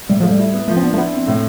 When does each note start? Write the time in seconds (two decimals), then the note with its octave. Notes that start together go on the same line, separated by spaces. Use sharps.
0.09 A2 G3
0.20 F3 A3
0.31 G3
0.39 E4
0.53 B3
0.68 F3 A3
0.77 C4
0.82 B3 D4
0.93 A3
0.98 B3 E4
1.13 C4
1.27 A2